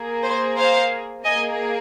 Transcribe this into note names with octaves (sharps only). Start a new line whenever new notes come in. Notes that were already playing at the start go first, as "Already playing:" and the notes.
Already playing: A#3 G#4
C5
C5 F5
A#3 G#4 D#5 G#5